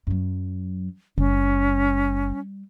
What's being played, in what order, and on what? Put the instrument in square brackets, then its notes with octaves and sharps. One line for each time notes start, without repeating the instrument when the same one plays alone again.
[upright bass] F#2 F#3
[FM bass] F#1 [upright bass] G3 [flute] C#4